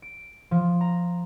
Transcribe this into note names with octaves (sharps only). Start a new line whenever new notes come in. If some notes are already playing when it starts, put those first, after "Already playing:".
D7
F3
A#5